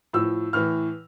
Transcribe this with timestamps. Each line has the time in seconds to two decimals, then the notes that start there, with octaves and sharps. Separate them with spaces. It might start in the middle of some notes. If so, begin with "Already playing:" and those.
0.13 A2 F3 E6
0.53 A2 E3 F6